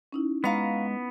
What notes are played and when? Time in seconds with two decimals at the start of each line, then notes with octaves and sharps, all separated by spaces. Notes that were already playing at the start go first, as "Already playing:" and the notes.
0.12 C#4 D#4 E4
0.44 G#3 B3 F5 A#5 C#6